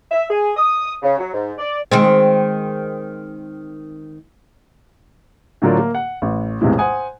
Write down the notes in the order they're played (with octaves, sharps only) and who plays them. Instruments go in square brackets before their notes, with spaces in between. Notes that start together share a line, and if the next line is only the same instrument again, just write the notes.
[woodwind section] E5
G#4
D#6
C#3
F#3
G#2
D5
[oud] D#3 G#3 C4
[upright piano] A2 D3 F#3 F4 A#4 D5
A#3
F#5
A1
B1 E2 A2 C3 E3 G#3
C5 F#5 G#5 D#6